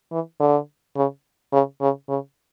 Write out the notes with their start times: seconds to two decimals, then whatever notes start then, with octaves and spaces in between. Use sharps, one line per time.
0.12 E3
0.40 D3
0.96 C#3
1.53 C#3
1.81 C#3
2.09 C#3